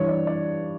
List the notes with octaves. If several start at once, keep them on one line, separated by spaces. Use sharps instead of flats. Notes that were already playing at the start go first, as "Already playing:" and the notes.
Already playing: G2 E3 C#5
D5
D5